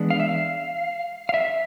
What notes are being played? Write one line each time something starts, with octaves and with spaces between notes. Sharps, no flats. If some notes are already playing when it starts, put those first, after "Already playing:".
Already playing: E3 G#3 B3 D4
F5
E5
F5
F5
E5